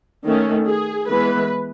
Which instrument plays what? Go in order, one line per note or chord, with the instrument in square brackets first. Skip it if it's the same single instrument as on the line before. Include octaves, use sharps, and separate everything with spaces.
[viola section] D#3 A3 C#4
G#4
E3 G#3 B3 B4